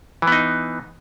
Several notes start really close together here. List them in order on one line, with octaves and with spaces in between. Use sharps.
E3 B3 D#4